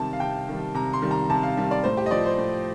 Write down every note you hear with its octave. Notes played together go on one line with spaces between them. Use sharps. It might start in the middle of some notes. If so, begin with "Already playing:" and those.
Already playing: C3 D#3 G3 A5
F5
C3 G5
D#3 G3
C3 A#5
C6
D#3 G3
A#5
C3 A5
F5
D#3 G3
D5
A2 C5
G4
D#5
F3 D5
C5
A2